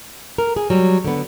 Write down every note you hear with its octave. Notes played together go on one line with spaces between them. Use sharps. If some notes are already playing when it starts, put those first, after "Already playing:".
A#4
G#4
F#3 G3
D3 B3